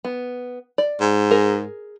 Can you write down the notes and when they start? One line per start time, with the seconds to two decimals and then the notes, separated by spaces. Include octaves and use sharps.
0.05 B3
0.78 D5
1.00 G#2
1.31 G#4 A#4